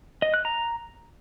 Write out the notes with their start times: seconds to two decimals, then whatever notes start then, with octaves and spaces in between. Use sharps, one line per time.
0.22 D#5
0.34 F#6
0.45 A#5